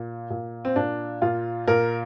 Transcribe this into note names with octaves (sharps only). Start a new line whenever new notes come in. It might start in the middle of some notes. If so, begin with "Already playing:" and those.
Already playing: A#2
A#2
C4
A#2 D4
A#2 F4
A#2 A#4